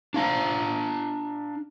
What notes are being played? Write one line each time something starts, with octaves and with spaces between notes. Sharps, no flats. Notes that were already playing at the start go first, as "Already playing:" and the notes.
D4 F5 A#5